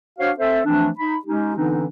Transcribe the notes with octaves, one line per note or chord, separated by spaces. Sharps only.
D4 F#4 C5 C#5 F5
C4 A4 C5 E5
E3 F3 A3 C4 D4
D#4 B5
G#3 C#4 D#4 G4
D3 E3 B3 C4 D4 D#4